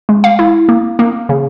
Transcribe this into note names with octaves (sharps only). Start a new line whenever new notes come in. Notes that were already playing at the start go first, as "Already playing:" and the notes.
G#3
F5
E4
A#3
A#3
C#3